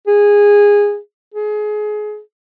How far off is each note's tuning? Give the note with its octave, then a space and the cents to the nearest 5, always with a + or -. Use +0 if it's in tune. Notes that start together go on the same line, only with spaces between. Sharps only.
G#4 -15
G#4 +25